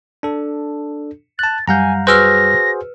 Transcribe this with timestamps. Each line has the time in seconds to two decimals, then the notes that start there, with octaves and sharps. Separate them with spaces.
0.23 D4 A4
1.39 A5 F#6 A6
1.68 F#2 G3 F5 F#5 G#5 A#5 G6
2.07 F#4 G#4 B4 C5 E6 F6 A#6